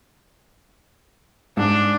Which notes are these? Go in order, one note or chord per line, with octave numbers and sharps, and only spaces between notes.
G#2 D4